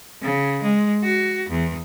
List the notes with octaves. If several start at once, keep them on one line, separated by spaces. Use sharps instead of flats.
C#3
G#3
F#4
E2